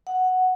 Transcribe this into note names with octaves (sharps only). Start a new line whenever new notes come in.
F#5